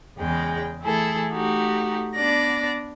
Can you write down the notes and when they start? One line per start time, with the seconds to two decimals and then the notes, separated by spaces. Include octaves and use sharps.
0.18 E2 C#3 G#3 G5
0.81 E3 A3 E4 G#4 A4
1.30 A3 D#4 F#4 G4
2.14 B3 D4 D5 A#6